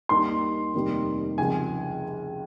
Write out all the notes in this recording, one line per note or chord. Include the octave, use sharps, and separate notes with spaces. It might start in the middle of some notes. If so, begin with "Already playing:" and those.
D#2 D#3 G3 A#3 C6
F1 D#2 D#3 G3 A#3
C#2 C3 F3 G#5